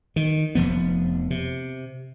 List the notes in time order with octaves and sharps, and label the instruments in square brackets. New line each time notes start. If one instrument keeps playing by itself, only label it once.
[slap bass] D#3
F1 F3 B3
C3